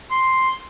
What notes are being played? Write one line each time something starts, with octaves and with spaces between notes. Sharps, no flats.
C6